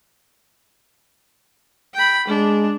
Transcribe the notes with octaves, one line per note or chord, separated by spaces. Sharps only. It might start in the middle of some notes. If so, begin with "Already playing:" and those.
G5 B5
G#3 D4